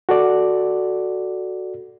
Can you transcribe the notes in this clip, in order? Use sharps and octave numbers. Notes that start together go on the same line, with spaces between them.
F#4 A4 D5